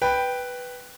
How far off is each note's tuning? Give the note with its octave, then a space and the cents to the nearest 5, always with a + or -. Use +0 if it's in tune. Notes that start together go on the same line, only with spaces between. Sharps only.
B4 +0 G5 +0